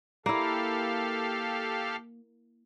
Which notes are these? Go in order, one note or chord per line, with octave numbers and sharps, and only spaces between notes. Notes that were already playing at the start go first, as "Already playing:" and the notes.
A#3 E4 G4 A4 F5